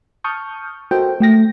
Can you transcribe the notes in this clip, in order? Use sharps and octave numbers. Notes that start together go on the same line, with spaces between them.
A5 C#6 D#6 F6 G6
F#4 A4 A#4 C5 D#5 G5
A3 G5 A#6